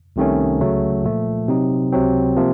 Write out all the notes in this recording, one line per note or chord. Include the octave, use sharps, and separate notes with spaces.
C2 C3 D#3 A3 C#4
C#2 C#3 F#3 A3
A#2 F3 A3
C3 F#3 C4 D#4
C#2 C3 F#3 C4
C3 F3 A#3